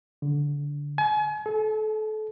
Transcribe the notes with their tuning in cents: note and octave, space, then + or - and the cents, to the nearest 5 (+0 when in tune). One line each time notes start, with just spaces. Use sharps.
D3 -20
G#5 +35
A4 -30